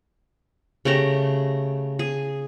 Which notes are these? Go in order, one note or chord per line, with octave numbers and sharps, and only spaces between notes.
C#3 A3 G4 A#5
G#4